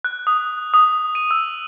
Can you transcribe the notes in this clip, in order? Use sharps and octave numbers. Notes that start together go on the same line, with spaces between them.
F#6
D#6
D#6
D#7
E6